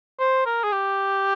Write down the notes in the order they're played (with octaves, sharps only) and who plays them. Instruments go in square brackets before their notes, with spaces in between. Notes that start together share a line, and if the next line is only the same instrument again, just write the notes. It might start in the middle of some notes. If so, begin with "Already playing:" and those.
[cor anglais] C5
A#4
G#4
G4